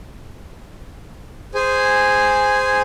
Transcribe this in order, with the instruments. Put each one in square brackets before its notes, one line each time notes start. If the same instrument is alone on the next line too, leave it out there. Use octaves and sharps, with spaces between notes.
[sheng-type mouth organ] G#4 C5 G#5